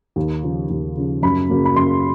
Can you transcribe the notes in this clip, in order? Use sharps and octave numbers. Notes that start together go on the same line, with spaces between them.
D#2
C#3 F3
D#2
C#3 F3
F#2 B5
C#3 F#3 A#3
B5
F#2 C6